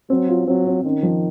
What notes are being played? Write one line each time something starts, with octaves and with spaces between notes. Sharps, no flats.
F#3 C4
F4
F#3 C4
C4
D#3 C#4
F3